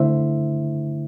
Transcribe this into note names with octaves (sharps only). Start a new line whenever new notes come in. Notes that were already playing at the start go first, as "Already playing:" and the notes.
Already playing: D3 A3 E4 C5 E5